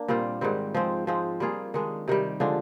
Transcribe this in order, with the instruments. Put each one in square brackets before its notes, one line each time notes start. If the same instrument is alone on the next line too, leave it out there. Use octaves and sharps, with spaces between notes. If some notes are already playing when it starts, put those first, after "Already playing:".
Already playing: [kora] A#3 D4
A#2 G3 C4 F4
G#2 D#3 G3 C4
F3 G#3 C4
F3 G#3 C4
G3 A#3 F4 G#4
D#3 G#3 D4
C3 D#3 G3
D3 F3 G#3 D4